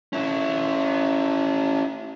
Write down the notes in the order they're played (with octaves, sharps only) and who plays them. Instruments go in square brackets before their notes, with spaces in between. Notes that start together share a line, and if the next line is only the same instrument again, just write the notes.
[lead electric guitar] C#4 E4